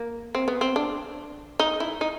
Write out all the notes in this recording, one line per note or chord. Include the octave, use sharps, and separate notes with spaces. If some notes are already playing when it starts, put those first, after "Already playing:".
Already playing: A#3
C4
B3
C4
D4
D#4
E4
D#4